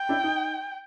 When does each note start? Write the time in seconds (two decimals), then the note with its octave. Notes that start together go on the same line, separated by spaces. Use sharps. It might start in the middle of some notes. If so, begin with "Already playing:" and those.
Already playing: G5
0.09 D4 E4
0.24 D#4